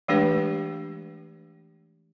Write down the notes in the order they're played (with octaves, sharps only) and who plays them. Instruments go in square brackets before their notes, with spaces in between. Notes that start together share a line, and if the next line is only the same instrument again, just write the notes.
[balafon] E3 G#3 A3 D4 G4 B4